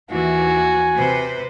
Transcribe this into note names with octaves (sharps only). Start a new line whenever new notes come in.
D#2 E3 E4 F#4 G#5
C3 B4 C5